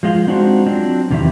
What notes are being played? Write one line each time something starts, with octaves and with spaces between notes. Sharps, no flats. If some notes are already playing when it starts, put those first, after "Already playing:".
F3 G#3 F4
G#3 C4 D4 D#4 F#4 C5
F#3 C4 D4 F4
E2 C3 D#3 E3 G4 E5